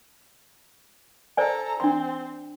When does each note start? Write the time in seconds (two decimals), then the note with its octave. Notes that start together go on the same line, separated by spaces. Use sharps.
1.37 A4 C5 D5 G#5 A#5
1.80 C4 D4 C6